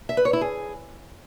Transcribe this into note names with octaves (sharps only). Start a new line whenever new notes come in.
E5
B4
C#5
E4
G#4